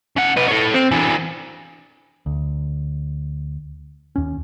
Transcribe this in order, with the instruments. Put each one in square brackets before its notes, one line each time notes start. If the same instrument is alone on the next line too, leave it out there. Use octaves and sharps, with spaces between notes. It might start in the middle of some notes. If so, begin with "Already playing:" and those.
[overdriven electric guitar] C#3 F#5
D#4 B4
A4 C#5
C4
E3 D4
[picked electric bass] D2
D#2 C#4